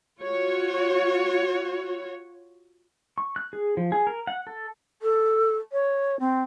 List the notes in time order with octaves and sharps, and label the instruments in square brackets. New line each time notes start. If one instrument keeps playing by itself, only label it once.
[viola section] F4 F#4 C#5
[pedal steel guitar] C#6
F#6
G#4
F3
G#4
A#4
F#5
A4
[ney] A4
C#5
C4